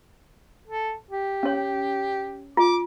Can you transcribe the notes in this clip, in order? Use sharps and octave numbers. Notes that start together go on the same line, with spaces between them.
A4
G4
C#4 C#5
F4 D6